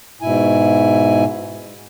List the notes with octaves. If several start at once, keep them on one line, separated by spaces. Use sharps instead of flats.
G#2 B2 E4 G#5